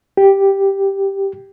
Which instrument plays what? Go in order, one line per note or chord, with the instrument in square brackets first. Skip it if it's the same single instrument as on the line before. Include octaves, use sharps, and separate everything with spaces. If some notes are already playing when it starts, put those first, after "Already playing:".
[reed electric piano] G4